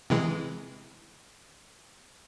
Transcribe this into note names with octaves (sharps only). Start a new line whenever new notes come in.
C3 E3 G#3